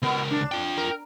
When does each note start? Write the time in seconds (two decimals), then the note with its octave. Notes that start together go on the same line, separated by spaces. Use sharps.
0.02 C#2 B2 B3 A#4
0.31 D4
0.52 F4 G5
0.77 A#4